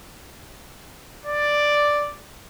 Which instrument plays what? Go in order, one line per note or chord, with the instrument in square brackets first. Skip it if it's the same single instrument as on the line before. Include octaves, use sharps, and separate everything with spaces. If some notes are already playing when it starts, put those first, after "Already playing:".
[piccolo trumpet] D5